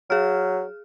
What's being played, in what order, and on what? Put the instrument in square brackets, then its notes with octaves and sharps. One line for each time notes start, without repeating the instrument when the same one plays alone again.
[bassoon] F#3 [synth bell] G#4 F6